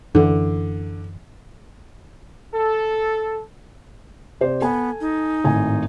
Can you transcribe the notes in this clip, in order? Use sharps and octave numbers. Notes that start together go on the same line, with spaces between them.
F#2 D3 E3
A4
C3 C5 D5
B3 A4 G#5
D#4
G#1 A2 G#5